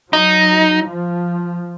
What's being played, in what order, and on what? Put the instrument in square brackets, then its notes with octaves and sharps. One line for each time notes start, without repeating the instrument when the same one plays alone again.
[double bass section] F#3 [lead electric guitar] D#4
[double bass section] F3